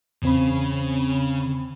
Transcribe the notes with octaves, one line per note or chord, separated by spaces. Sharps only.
E2 C#3 C4 B5